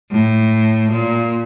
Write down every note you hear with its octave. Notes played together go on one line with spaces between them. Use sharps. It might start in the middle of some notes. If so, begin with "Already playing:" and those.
A2
A#2